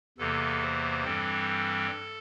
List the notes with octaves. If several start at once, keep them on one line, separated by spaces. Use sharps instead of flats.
E2 C3 E3 A#3 A4
C5
G2 E3 G3 C4 A4